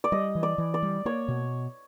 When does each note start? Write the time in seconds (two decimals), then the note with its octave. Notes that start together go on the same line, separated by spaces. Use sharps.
0.04 D5
0.12 G3 D#5
0.35 E3
0.43 D5
0.58 E3
0.74 D5
0.83 G3
1.05 A#3 C#5
1.28 B2